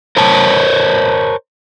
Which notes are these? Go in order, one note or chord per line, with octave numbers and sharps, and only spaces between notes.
A#4 C5 C#5 A5